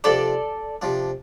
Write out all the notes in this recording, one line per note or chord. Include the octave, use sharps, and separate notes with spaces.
C3 F3 D4 A4 D5
C3 F3 D4